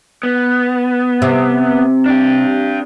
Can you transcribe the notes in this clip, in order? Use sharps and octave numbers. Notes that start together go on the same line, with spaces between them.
B3
C3
D4 G4